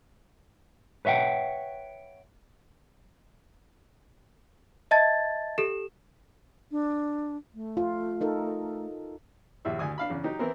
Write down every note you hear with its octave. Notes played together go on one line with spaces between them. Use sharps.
B4 C#5 E5 F#5 G5
D#5 E5 A5 G#6 A6
G4 A4 E7
D4
A3
F4
D#4 A4 A#4
A#1 D#2 E4 E5
D2 G#5 D#6
D4 F5 B5
E2 C#3
F#3 D#4 G4
E3 B3 C4 E4 A#4